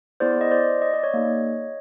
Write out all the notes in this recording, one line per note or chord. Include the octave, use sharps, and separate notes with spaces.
B3 E4 G#4 C5 D5
D#5
C5 D5
D#5
D5
C#5 D#5
A#3 D#4 G#4